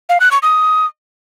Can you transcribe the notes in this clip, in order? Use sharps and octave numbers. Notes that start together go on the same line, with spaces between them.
F5
F#6
C#6
D#6